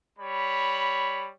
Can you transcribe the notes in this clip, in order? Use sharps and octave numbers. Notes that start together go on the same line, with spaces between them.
G3 C#5 B5